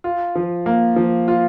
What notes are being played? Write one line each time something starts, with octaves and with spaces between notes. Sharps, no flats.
F4
F3
A#3
F3
F4